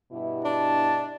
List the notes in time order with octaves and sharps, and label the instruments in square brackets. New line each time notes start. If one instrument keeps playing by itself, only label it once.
[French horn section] G2 B2 E4
[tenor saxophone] D4 [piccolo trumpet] A5